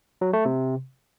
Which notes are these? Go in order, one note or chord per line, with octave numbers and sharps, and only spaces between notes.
F#3
A3
C3